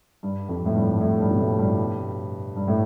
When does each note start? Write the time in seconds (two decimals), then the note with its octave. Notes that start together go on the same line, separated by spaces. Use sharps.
0.23 G2
0.49 F2
0.66 A2
0.75 G2
0.94 G2
1.01 A2
1.20 G2
1.31 B2
1.39 A2
1.59 G2
2.56 G2
2.68 A2